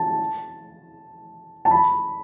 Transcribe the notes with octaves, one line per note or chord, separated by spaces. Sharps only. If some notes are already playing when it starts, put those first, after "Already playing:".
Already playing: A5
A5
B5